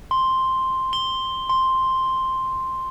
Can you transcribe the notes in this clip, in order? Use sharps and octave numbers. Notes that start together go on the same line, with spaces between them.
C6
G7
C6